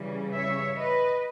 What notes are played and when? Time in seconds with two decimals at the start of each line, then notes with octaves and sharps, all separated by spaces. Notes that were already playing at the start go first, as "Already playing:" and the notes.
Already playing: C#3 E3 G3
0.33 C#5 E5
0.78 B4 D#5